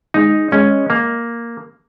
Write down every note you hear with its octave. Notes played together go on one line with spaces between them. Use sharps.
G#3 D#4
G#3 C#4
A#3